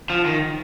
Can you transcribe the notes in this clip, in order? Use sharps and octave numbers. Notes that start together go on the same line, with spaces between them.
F3
D#3